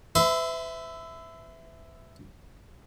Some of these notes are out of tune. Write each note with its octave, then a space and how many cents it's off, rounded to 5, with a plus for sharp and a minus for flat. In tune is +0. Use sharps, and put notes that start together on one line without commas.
B4 +40 E5 +0 C6 -30